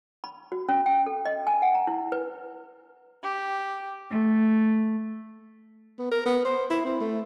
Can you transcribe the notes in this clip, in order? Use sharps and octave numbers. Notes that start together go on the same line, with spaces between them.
B5
F#4
C#4
G5
A4
D#5
G#5
F#5
A#5
E4
B4
G4
A3
B3
A#4
B3
C5
E4
C4
A3